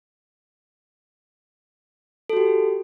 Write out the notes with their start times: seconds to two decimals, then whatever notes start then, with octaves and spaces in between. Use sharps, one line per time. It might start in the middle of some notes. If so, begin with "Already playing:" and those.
2.30 A4
2.33 F#4
2.37 G4